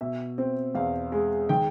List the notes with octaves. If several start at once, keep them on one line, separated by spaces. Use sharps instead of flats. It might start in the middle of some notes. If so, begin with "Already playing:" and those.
B2 E5
C4
E2 F5
G#3
D#3 G5